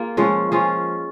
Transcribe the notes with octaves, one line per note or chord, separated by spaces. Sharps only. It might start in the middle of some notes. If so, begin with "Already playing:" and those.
Already playing: A#3 F4 G#4
F3 G#3 C#4
F3 C#4 F4 G#4